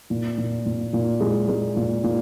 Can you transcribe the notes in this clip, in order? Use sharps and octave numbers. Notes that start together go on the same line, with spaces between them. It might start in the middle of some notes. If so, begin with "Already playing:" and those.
A#2
A#2
A#2
A#2
G#3
G#3
A#2
A#2